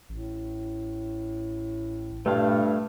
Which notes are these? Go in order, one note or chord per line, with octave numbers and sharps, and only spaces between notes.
A1 A2
G2 A#2 A3 F5